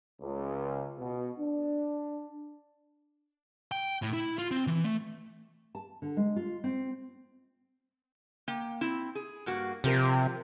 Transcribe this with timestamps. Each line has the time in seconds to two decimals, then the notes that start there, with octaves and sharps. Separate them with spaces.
0.22 C#2
0.98 B2
1.39 D4
3.72 G5
4.02 A2
4.13 E4
4.38 F4
4.51 C4
4.67 E3
4.85 A3
5.75 A5
6.02 D3
6.17 G#3
6.36 F4
6.64 C4
8.48 A#3 G5
8.81 C4 E4
9.15 G#4
9.46 G2 A#3 F#4
9.84 C3 F3 G4 A#4